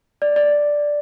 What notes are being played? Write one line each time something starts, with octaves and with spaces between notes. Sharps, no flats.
D5
D5